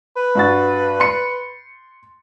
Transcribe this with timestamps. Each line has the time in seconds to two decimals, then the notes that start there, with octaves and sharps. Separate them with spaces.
0.17 B4
0.35 G2 F#4 A6
1.00 C6 C#7